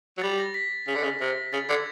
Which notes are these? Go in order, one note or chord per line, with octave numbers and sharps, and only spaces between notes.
F#3
G3 A6
A#6
B6
C#3 B6
D3
C#3
C3 A#6
C#3 A6
D3 G#6